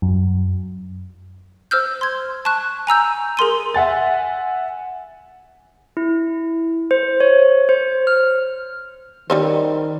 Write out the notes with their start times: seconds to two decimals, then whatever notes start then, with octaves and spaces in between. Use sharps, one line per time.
0.02 F#2
1.71 C5 E6 F6 G6
2.01 C6 G#6
2.45 A5 C#6 F#6
2.87 G#5 A#5 E6 G6
3.37 G#4 A#4 C6 D#7
3.74 E5 F#5 G#5 A6
5.97 E4
6.91 C5
7.20 C#5
7.69 C5
8.07 F6
9.30 D#3 G3 C#4 C5